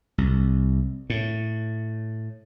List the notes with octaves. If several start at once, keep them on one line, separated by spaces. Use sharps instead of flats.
C2
A2